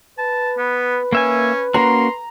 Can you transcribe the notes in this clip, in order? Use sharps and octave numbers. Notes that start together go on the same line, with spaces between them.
B4 A5
B3
A#3 C#4 E5 G#5
A#3 C#4 F#4 A#5 C6